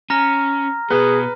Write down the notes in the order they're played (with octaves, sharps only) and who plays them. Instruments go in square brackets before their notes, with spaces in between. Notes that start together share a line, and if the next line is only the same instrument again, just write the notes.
[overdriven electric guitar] C#4 [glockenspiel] A#5 F6 A#6
[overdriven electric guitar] B2 B3 [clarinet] G#4 [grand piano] B4